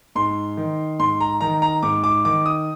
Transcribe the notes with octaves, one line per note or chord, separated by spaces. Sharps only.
G#2 C6
D#3
G#2 C6
A#5
D#3 A#5
A#5
G#2 D6
D6
D#3 D6
D#6